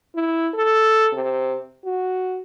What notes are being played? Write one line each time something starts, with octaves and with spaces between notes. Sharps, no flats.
E4
A4
C3
F#4